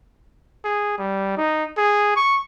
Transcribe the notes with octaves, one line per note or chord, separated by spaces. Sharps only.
G#4
G3
D#4
G#4
C#6